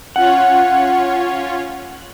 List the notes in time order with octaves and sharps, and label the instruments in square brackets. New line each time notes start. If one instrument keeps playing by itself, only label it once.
[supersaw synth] C#4 F4 C#5 [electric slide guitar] F#5